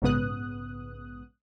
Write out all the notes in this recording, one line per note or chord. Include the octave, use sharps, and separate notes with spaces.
A#1 G#2 C#3 B3 D#6 F#6